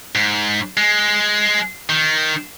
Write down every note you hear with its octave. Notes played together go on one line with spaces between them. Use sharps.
G#2
G#3
D#3